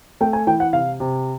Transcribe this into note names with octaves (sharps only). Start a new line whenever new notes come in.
A3 G5
G#5
E3 G5
F#5
C3 F5
C3